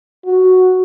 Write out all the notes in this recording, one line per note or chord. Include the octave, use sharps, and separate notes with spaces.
F#4